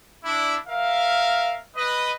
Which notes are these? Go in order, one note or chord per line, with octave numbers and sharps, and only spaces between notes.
D4 E4
A#4 E5 F5
B4 D#5